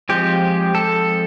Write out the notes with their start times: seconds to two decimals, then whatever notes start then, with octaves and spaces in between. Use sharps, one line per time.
0.09 F3 G#3 C4 G4
0.75 A4